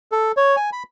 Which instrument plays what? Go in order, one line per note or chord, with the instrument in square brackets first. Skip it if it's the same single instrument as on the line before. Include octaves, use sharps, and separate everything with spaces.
[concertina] A4
C#5
G#5
B5